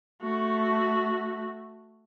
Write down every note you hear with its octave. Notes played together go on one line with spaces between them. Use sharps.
A3 F#4